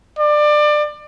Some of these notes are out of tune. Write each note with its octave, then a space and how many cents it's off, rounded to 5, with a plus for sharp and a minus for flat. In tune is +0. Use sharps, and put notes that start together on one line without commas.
D5 +25